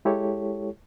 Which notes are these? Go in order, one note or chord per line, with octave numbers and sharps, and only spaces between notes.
G#3 E4 G4 A4 C#5